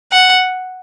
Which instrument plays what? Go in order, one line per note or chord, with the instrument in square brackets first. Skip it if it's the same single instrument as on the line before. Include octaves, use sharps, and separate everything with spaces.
[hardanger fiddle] F#5